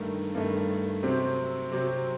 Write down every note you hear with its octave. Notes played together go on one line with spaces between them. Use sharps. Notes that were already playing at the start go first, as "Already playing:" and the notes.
Already playing: G2 D#3 A3
G2 D#3 A3
C3 F#3 C4
C3 F#3 C4